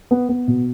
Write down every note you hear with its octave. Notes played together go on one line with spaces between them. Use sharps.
B3
B3
B2